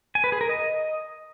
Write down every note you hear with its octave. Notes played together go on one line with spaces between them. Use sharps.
G#5
B4
G#4
A#4
D#5